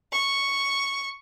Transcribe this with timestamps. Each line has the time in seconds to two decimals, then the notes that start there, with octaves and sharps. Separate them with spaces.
0.12 C#6